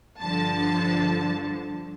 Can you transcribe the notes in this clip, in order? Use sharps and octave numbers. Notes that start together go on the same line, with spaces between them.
G2 D3 F3 A5